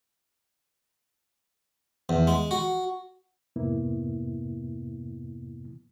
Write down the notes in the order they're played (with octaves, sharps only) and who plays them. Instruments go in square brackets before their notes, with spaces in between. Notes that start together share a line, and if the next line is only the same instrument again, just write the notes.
[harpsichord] E2
G#3
F#4
[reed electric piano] F2 G#2 C3 A#3 B3 E4